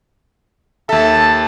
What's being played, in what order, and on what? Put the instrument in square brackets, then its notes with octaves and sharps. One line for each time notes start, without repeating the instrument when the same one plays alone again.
[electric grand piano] D#2 A4 [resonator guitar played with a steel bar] E5 [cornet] A5